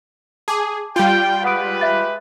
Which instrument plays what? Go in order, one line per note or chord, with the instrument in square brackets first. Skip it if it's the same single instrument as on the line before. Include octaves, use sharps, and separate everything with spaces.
[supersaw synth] G#4 [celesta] A5 D6
[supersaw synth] G3 F4 [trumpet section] G5
[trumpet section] G#3 G4 B4 [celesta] F#5 D#6 D7
[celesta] E5 F5 A6